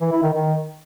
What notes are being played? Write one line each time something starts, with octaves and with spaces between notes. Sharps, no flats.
E3
E4
D#3
D#3